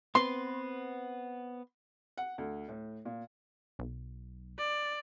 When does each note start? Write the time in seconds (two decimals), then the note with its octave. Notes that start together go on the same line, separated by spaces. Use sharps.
0.15 B3 C4 B4 C6
2.18 F#5
2.38 D2
2.68 A2
3.05 A#2
3.79 B1
4.59 D5